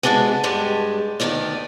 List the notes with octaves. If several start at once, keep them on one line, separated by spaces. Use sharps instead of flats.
G#3 B3 D4 D#4 F#4
G2 G#3 D4 G4
D2 G#2 D#3 B3 D5